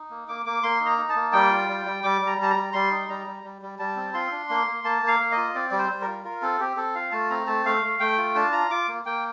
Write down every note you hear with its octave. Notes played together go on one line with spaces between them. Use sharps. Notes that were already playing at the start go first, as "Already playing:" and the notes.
Already playing: D#4
A#3
A#3 D6
A#3 D6
A#3 C6
D#4
A#5
D#4
A5
A#3
G3 G5
F4
G3
G3
G3 D6
G3
A#5
G3 A5
A#5
G3
G3 C6
D#4
G3 A#5
G3
G3
G3
G3 A5
C4
F4 C6
D4
A#3
A#3
A#3 A5
A#3
F5
A#3
D#5
F4
C4 D5
G3 D5
C5
G3
A#4
F4
F4 A#4
C4 A4
C4 G4
C4 A4
F4 F5
A3 A5
C4 A#5
A3 A5
A3 F5
A3
A3 G5
F4
D4 A5
F4 A#5
F4 D6
A#3
A#3 G5